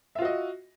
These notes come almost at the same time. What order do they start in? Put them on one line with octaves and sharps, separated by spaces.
E5 F4 F#4 D#5